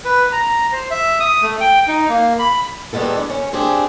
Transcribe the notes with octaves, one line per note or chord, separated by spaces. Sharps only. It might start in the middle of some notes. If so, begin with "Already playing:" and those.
B4
A#5
C5
E5
D#6
A3
G5
D#4
A#3
B5
E2 G3 G#3 B3 A4
D4
C#4
C4 D4 G4 G#4